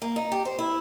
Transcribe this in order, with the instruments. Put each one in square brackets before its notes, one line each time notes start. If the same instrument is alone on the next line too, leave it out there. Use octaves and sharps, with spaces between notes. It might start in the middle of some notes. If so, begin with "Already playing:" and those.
[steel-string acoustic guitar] A#3
D#4
G4
C5
E4